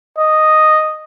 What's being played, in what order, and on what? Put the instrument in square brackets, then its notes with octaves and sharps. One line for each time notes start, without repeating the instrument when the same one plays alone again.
[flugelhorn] D#5